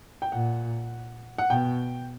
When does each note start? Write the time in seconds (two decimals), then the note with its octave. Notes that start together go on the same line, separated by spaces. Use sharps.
0.22 G5
0.32 A#2 F#5
1.38 F#5
1.50 B2 G5